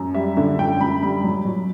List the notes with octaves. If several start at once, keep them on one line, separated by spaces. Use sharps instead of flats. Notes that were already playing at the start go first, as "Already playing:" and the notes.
Already playing: F#2
G3 E5
D3 E5
F#2 G5
F#2 B5
G3 B5
F#3
F#3